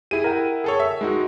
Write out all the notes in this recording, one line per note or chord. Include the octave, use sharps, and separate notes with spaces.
E4 G4 G#4 D#7
A#4 F#5 G5
G#4 A4 C#5
E5
G#3 D#4 F#4